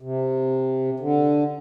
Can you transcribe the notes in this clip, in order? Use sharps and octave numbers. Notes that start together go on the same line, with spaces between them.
C3
D3